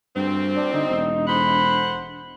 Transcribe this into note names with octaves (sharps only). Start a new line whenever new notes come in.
D2 G2 C4
D4
D3 D#4
E1
D3 C5 F#5 B5